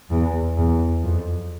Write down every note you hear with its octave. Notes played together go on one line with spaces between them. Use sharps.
E2
E2
F2